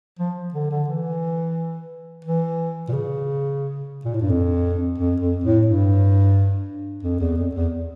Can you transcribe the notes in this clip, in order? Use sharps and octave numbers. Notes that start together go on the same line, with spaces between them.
F3
D3
D3
E3
E3
A#2
C#3
A#2
A2
G2
F2
F2
F2
A2
G2
F2
E2
F2
E2